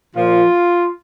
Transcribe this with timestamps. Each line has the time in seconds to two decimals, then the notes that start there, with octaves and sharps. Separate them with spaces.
0.16 A#2 F3 F4